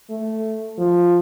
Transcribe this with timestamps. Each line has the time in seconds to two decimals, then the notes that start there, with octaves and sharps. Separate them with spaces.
0.10 A3
0.79 F3